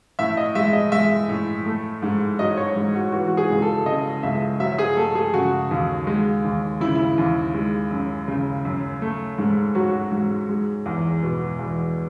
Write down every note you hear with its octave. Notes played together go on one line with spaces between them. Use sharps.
A2 E5
D#5
G#3 E5
D#5
G#3 E5
A2
A3
G#2
F#3 D#5
C#5
G#2
F#4
E3 F#4
F#4
G#4
C#2
A4
C#3 D#5
C#2 E5
F#3 E5
G#4
A3 A4
G#4
C#3 F#4
D#2
G#3
D#2
C#3 E4
E4
D#2
G#3
F#2
C#3
F#2
A3
G#2
F#3 F#4
G#2
G#3
E2
B2
E2